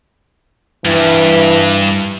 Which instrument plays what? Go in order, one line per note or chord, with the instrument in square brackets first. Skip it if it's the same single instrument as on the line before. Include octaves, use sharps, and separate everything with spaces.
[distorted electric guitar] G2 [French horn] E3